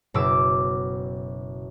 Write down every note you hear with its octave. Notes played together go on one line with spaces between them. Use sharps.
F#1 B2 D6 E6